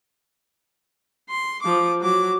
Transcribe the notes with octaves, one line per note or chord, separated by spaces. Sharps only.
C6
F3 D6
F#3 D6